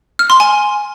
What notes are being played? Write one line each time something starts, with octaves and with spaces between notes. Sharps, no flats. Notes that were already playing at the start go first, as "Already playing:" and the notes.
F6
C6
G#5